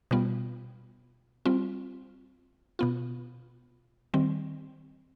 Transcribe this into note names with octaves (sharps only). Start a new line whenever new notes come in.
B2 G3 B3 F4
G3 C4 F4
B2 B3 F4
D#3 G3 C4